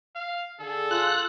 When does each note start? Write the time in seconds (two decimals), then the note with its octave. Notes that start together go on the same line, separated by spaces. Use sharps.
0.15 F5
0.60 D3 G#4 A4
0.91 F4 F#6